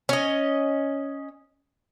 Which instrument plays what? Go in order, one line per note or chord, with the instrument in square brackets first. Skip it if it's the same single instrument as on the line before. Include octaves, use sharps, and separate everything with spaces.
[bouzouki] C#4 D#5